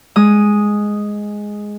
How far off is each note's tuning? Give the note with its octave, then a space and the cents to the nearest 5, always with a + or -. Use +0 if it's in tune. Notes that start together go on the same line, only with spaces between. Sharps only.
G#3 +0 D#6 +0